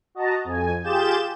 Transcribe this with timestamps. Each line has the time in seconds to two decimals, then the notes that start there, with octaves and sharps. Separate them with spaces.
0.15 F#4 D#5 A5 A#5
0.45 F2 G#5
0.84 F4 G4 G#4 G6 A6 E7